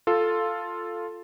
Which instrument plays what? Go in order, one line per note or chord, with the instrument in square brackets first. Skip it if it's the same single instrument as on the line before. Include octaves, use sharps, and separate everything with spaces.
[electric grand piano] F4 A4